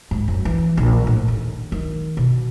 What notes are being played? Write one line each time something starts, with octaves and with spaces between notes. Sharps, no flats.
G#2
F#2
E3
A#1
A2
D#2
D#3
B2